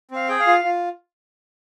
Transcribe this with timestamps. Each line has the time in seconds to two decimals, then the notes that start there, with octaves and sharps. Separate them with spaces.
0.11 C4 F5
0.28 G#4 G5
0.39 F5
0.47 F4
0.64 F4